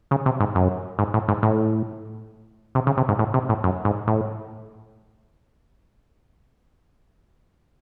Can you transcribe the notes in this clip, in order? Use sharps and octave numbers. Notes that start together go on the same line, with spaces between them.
C#3
C3
G#2
F#2
G#2
A2
G#2
A2
C3
C#3
C3
G#2
A2
C3
A2
F#2
G#2
A2